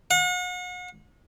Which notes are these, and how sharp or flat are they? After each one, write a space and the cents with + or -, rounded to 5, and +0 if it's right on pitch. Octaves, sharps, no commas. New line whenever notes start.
F#5 -40